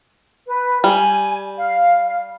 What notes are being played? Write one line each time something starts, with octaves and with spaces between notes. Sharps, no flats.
B4
G3 G#5
F5